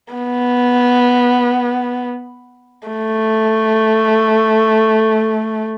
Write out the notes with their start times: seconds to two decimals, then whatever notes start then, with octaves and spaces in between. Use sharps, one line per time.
0.13 B3
2.88 A3